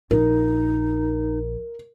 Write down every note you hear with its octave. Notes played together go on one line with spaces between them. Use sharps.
A#1 D#4 A#4